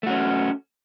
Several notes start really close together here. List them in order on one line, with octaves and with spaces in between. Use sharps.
A3 F#4 C#4